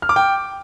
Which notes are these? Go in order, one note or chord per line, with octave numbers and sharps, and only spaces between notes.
F6
D6
G5